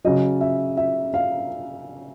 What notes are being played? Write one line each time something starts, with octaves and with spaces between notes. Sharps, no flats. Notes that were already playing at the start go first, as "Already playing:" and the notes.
C#3 F#3 D#5
E5
E5
F5